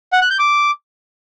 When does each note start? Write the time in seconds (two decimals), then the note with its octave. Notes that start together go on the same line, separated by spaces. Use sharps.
0.13 F#5
0.21 F#6
0.30 G6
0.39 D6